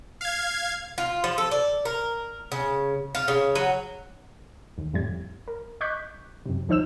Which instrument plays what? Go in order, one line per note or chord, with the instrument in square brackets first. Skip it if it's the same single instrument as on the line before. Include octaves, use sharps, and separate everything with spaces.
[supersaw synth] F5 G#6
[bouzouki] F4
F3
A4
D5
A#4
C#3
F4
C#3
F#3
[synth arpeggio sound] D#2
F2 A2 G3 G#6
A#4
D#5 C#6 D6 F#6 G6 B6
F#2 C3
D#2 F3 D#4 C5 E6 E7